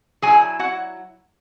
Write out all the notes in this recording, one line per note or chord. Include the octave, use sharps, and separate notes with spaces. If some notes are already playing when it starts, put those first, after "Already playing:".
F#3 E4 G#4 G#5
F#4 F#5